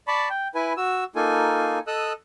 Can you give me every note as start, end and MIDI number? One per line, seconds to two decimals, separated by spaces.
0.08 0.29 74
0.08 0.29 81
0.08 0.29 83
0.08 0.29 85
0.30 0.48 79
0.55 0.73 64
0.55 0.73 71
0.55 0.73 80
0.77 1.04 66
0.77 1.04 88
1.16 1.79 58
1.16 1.79 63
1.16 1.79 65
1.16 1.79 69
1.16 1.79 80
1.87 2.13 69
1.87 2.13 75
1.87 2.13 87
1.87 2.13 88
1.87 2.13 90